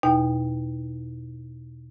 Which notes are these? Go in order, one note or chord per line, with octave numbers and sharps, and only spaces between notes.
E2 B2 D#4 G5